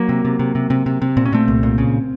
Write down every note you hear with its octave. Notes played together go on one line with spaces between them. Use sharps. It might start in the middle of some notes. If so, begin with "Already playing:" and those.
Already playing: F#3 A#3
C3
C3
C3
C3
C3
C3
C3
A#2 C4
C#4
A#2 A3 C4
C2
A#2
C#3